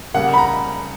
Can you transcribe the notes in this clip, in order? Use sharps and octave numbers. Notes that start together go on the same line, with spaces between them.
C#3 G3 A#3 F#5
B5
A#5